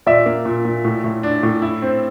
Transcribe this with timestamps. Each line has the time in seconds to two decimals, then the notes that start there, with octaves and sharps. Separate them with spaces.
0.06 A#2 D5 E5
0.26 A#3
0.45 A#2
0.65 A#2
0.85 A2
1.04 A2
1.23 D4
1.43 A2
1.62 E4
1.82 C4